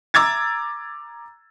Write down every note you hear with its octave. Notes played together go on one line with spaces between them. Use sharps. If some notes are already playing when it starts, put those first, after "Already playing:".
A#5 D6 E6 G#6 A6